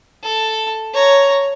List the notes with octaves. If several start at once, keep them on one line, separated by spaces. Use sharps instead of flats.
A4
C#5 A#5